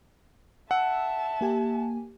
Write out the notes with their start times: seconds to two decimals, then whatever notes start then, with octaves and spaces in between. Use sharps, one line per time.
0.71 E5 F#5 A5 E6
1.41 A#3 G4 G#5